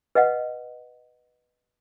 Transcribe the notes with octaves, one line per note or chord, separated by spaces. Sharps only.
B4 D#5 F5 F#5